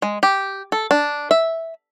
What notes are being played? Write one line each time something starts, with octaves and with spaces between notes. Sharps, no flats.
G#3
G4
A4
D4
E5